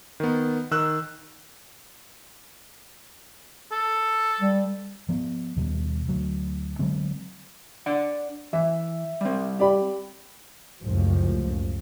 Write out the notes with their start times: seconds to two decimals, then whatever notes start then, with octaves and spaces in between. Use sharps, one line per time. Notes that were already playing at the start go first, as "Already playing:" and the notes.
0.20 D#3 B3
0.71 D#3 E6 F#6
3.72 A4
4.40 G3
5.09 F3 B3
5.56 D#2 B2 G3
6.08 D2 F#3
6.79 D3 F#3 G#3 C4
7.86 D4 D5 F#5
8.53 E3 E5
9.21 G3 C4
9.59 G4 D5 B5
10.82 F1 C#2 F#2 A2 F3